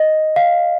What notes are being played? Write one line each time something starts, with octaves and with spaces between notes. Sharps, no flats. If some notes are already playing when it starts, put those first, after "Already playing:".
Already playing: D#5
F5